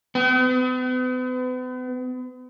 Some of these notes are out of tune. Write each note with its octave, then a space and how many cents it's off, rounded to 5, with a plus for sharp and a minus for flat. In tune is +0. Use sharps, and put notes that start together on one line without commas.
B3 +40